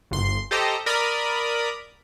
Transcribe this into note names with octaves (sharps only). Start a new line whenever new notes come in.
G1 C6
G4 A4 C5 D#5 A#5
A#4 D5 B5 D#6